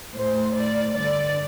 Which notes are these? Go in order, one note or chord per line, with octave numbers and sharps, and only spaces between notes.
A2 C5
A2 D5
G2 D3 D5